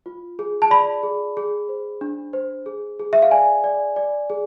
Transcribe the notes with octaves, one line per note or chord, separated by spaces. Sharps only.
F4
G#4
A5
D5 B5
G#4
G#4
C5
D4
C5
G#4
G#4
E5
F5
D5 G#5
D5
D5
G#4